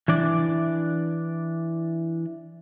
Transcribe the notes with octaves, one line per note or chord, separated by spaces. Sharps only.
E3 D4 D5